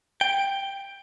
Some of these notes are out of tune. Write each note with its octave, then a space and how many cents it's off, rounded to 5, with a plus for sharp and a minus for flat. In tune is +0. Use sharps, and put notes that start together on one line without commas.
G5 +10